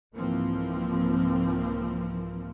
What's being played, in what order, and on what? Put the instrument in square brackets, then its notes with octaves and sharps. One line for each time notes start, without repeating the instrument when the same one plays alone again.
[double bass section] C2 G#2 E3 F3 A#3 C4